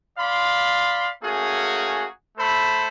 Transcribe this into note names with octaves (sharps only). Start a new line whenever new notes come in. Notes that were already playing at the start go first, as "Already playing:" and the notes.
D5 F5 B5 C6
A3 A#3 C#4 F#4 G#4
A3 A4 C5 B5